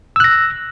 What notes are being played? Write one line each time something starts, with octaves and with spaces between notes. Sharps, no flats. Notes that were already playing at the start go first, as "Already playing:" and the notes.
E6 F#6 A#6